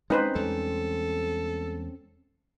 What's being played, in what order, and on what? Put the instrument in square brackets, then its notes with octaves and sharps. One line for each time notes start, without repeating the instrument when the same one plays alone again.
[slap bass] G#3 [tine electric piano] C4 C#4 [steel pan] D#4 B4 C5
[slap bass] E2 G3 G#3 [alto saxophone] A4